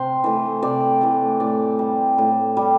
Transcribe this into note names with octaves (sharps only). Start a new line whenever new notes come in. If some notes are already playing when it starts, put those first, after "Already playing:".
Already playing: C3 C5
E3 A3
C3 D5
E3 A3
A2 D5
G3
A2
G3